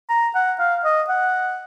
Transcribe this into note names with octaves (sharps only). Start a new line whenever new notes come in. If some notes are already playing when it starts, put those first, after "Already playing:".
A#5
F#5
F5
D#5
F#5